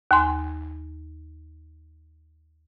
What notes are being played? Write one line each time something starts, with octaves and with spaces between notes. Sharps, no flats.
D#2 G#5 C6